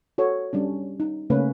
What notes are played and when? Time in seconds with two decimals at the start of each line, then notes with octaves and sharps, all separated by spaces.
0.18 F#4 A4 C#5
0.53 G3 C#4 D4
1.00 D#4
1.30 C#3 A3 A#3 C#4 B4